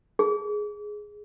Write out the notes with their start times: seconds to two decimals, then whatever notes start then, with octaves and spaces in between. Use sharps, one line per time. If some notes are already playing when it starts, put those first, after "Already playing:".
0.19 G#4